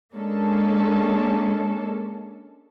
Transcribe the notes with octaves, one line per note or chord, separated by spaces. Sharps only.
G#3 A#3 C#4 D4 A4